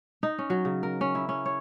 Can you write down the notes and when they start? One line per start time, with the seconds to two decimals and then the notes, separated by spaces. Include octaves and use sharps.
0.23 D#4
0.39 C#4
0.50 F#3
0.65 C#3
0.83 A#4
1.01 C#4
1.15 E4
1.29 C#4
1.46 C#5